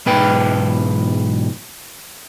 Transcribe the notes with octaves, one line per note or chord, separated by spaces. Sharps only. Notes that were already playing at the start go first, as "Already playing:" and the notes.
B1 G#2 B4 G5